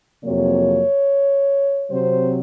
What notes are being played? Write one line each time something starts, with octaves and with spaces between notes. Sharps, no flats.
F2 C3 F#3 A#3 C#5
C3 F#3 C4 C5